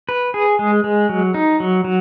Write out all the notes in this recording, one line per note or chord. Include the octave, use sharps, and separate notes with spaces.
B4
G#4
G#3
G#3
F#3
D#4
F#3
F#3